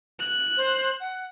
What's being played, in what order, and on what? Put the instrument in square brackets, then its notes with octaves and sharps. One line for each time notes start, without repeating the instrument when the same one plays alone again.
[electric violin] F#6
[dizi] C5
F#5